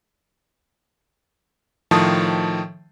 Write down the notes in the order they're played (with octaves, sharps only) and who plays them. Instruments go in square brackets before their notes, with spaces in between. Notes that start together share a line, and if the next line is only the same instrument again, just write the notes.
[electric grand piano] A2 D#3 F3 A5 D#6